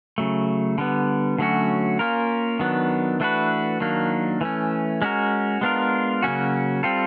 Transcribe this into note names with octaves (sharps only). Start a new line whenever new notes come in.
C#3 F#3 A3
D3 G3 B3
D3 F#3 A3 C#4 F#4
A#3 C#4 F4 A#4
D#3 F#3 B3 D4
E3 A3 D4 F#4 B4
D#3 F#3 A#3 D4
E3 A3 C#4
G#3 C#4 F#4 A#4
G#3 B3 D4 F4 A#4
C#3 F#3 A#3 C#4 F#4
G3 C4 F4 A4